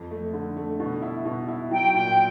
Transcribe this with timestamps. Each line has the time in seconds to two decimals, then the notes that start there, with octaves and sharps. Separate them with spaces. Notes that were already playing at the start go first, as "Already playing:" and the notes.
Already playing: F2
0.11 A3
0.34 D3
0.57 A3
0.80 B2
1.02 E4
1.25 B2
1.48 E4
1.71 F#3 G5
1.94 A#2 G5